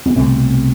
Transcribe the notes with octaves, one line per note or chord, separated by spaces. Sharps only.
B3
C2 B2 A3 C4